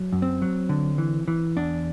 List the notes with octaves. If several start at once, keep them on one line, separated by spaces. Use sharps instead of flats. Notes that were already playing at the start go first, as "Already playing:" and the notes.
Already playing: F#3
F#2
C4
F#3
D3
E3
E3
E2 D4